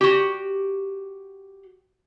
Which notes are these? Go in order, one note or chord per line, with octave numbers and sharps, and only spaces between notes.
F#4 G4